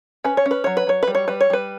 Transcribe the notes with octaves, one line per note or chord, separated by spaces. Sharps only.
C#4 B4
C#5
C#4
B4
F#3 C#5
B4
F#3 C#5
G3 B4
C#5
G3 B4
C#5
G3 B4